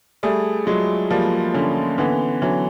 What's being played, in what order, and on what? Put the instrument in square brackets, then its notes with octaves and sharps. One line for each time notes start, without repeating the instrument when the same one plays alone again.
[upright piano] G3 A3 [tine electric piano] G#4
[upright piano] F#3 G#3 [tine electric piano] F4
[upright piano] F3 G3 [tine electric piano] A#3
[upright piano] D3 [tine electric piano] C#4
[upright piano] D3 E3 [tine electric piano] B3
[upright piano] D3 E3 [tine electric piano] F#3